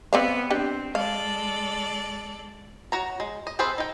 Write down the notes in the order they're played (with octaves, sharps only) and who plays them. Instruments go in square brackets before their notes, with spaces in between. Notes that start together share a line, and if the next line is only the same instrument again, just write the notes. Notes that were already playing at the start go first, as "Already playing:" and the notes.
[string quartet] B3 [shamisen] C4 D5 F5
[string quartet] C4 [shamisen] D4 G4
[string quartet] G#3 A4 D5 [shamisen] F5
[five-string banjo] F#4 C#5 A#5
G#3
D#5
C4 G#4 A4 B4 C5
D#4 G5